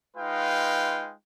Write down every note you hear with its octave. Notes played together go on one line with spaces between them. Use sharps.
G#3 D#4 F4 B4 F5 G5